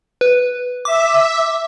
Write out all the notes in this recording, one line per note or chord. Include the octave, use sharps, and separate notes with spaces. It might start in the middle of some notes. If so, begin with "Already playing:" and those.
B4
E5 D6